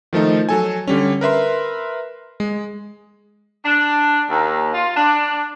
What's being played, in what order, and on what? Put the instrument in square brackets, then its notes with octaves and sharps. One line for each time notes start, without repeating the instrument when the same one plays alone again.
[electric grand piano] D#3 F3 A3 D#4
F#3 A4 G#5
D3 G3 C#4
A#4 B4 E5 C6
G#3
[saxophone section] D4
D#2
F4
D4